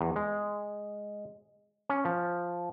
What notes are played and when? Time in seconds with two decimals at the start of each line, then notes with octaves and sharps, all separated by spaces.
0.01 E2
0.16 G#3
1.89 C#4
2.05 F3